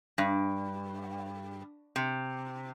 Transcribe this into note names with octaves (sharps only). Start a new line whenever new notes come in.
G2
C3